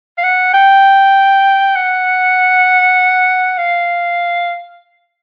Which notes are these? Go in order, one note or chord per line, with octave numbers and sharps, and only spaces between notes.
F5
F#5
G5
F#5
F5